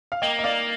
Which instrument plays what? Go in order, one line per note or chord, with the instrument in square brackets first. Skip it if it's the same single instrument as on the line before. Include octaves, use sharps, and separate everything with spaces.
[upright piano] F5
[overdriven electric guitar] A#3 [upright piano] D#5 G5
[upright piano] D#5
D5 F5